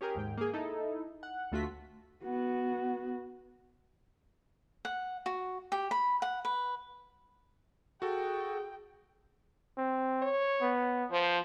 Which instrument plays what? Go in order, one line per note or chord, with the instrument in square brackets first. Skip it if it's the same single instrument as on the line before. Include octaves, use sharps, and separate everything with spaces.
[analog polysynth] C#4 G4 G#4 A#4
D#2 G#2 G5
A#3 G#4
D#4 E4 A4
F#5
D2 A3 F4 F#4 B6
[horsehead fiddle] B3 F#4
[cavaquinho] F#5
F#4
G4
B5
F#5
B4
[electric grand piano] F#4 A4 [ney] G#4 [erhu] G5
[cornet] C4
[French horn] C#5
[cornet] B3
[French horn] F3 [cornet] C5